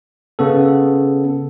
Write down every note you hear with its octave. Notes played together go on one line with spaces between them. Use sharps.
C#3 B3 A4